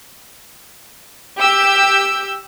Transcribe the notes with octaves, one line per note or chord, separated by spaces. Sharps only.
G4 E6 G6